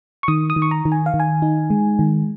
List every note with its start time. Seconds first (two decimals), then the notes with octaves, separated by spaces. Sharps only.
0.23 C#6
0.28 D#3 D#6
0.50 D#6
0.56 D#3
0.62 C#6
0.71 A#5
0.85 D#3
0.92 G#5
1.06 F5
1.14 D#3
1.20 G#5
1.42 D#4
1.70 G#3
1.99 D#3